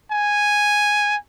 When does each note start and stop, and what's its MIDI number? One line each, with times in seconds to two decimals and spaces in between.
0.11 1.16 80